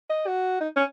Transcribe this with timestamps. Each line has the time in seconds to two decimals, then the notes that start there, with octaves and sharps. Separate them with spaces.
0.10 D#5
0.27 F#4
0.61 D#4
0.76 C#4